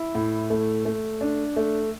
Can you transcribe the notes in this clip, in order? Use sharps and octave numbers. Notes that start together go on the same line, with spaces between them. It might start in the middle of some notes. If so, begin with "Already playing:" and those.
Already playing: E4
A2
A3
A3
D4
A3